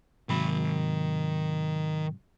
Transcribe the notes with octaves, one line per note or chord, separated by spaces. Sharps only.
G#2 C3 D#3 F#3 B5